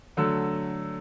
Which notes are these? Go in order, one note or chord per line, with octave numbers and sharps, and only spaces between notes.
D3 F#3 A3 E6